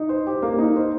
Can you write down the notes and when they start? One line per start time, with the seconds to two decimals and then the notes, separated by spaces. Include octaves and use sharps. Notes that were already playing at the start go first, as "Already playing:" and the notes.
Already playing: D#4
0.09 C5
0.27 G4
0.42 A#3
0.58 D#4
0.76 C5